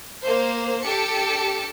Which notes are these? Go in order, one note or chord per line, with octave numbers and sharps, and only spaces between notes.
A#3 C5
D4 G4 A4 C#7